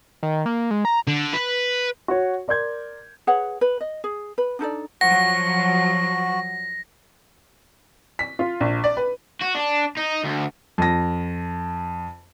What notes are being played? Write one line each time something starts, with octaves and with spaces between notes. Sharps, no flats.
D#3
A#3
G#3
A#5
D3
B4
F#4 C#5
A#4 D5 C6 G6 G#6
G#4 B4 C#5 F#5
B4
D#5
G#4
B4
D4 D#4 A4 D5
F3 F#3 F#4 F#5 A#6
B6
F4
A#1
D5
B4
F#4
D4
D#4
D2
F2 A#6